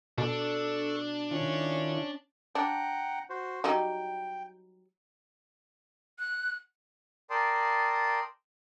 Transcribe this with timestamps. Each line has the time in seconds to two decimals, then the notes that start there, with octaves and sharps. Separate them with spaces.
0.18 B2 D4 A4 C#6 E6
1.31 D#3 C#4 E4 F4
2.55 D4 F#5 G5 A#5
3.30 F#4 C5
3.64 F#3 G3 D#4 G5
6.19 F#6
7.30 A#4 D5 G5 A5 C6 D#6